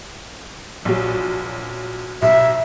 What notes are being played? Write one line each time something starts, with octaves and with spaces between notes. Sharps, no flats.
A#1 F#3
B1 E5